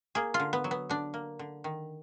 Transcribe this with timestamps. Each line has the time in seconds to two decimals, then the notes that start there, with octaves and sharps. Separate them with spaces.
0.15 A#3 G#4
0.34 F4
0.40 D3
0.53 B3
0.64 F#3
0.71 B3
0.89 D3 D4
1.14 A#3
1.39 D3
1.64 D#3